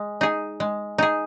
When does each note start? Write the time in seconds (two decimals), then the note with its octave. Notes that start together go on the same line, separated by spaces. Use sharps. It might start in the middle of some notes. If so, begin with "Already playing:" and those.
Already playing: G#3
0.21 D#4 G#4
0.60 G#3
0.98 D#4 G#4